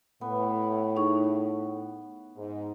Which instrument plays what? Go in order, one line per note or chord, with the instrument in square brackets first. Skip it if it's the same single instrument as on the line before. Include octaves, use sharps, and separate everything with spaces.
[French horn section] A2 [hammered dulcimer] B3
[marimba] D#4 G#4 C#6
[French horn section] G#2